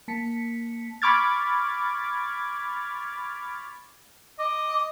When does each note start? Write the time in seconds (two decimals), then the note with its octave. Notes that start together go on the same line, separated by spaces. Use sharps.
0.08 A#3 A5 B6 C#7
1.02 B5 C#6 D6 F6 G#6 A6
4.39 D#5 D6